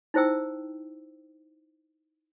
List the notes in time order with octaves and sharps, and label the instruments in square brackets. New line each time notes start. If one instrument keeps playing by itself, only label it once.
[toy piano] D#4 E4 C5 G5 E6